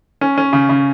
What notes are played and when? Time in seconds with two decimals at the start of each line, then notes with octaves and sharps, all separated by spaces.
0.21 C#4
0.38 C#4
0.53 C#3
0.69 C#3